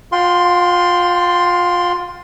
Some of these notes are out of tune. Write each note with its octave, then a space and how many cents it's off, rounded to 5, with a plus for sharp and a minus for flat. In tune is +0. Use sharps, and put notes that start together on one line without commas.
F4 +25 G5 -10 C6 +0